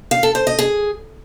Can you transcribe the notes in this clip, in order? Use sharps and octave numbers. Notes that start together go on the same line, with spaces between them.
F5
A4
C5
D#5
G#4